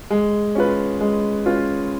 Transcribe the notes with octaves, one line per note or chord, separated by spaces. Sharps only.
G#3
C#4 F4 B4
G#3
C#4 F4 B4